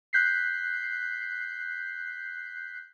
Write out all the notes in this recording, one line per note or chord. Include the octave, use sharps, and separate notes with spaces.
F#6 G6 B6 C7